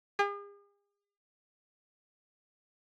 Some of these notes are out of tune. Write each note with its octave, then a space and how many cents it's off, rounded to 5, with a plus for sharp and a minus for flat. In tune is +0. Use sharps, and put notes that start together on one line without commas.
G#4 -45